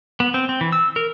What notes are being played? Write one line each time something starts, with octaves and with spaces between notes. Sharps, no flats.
B3
C4
C4
E3
E6
A#4